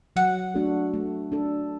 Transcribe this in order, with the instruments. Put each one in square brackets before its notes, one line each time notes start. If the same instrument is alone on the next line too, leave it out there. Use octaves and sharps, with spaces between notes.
[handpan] F#3 [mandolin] F#5
[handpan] A3 D4 F#4 A4
A3
D4 A4